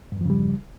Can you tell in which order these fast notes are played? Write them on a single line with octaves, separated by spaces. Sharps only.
G2 E2 F3 C#3 G3